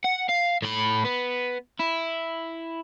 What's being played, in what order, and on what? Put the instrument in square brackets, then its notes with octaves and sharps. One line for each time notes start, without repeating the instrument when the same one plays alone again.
[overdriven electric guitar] F#5
F5
A2 B5
B3
E4